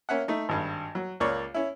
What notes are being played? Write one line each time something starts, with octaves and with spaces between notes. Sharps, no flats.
A#3 C#4 E5 F#5
A3 D#4
G#1 G2
F#3
C#2 A#3 C#5 D5 C#6
C#4 E4